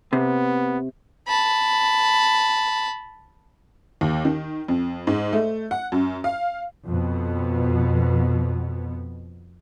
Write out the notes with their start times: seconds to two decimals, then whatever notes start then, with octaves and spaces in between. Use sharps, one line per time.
0.13 C3 B3
1.27 A5 B5
4.01 D#2
4.25 D#3
4.68 F2
5.07 G#2
5.33 A3
5.71 F#5
5.92 F#2
6.24 F5
6.86 F2 B2 B3